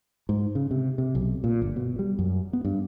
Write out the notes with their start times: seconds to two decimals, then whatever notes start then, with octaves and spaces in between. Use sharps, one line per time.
0.29 G#2
0.55 C#3
0.71 C3
0.98 C3
1.15 B1
1.44 A#2
1.62 G1
1.76 B2
1.99 G3
2.19 F#2
2.53 B3
2.65 G2